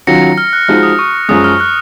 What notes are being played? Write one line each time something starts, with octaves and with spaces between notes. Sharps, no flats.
D#3 F#3 C#4 F4 A#6 C#7
F6
F#6
F3 G#3 D#4 F#4 F6
D#6
C#6
F#2 F3 G#3 D#6
F6
F#6